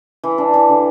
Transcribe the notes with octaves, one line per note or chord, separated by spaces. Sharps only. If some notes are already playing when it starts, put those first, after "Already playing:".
E3
D4
E3
D3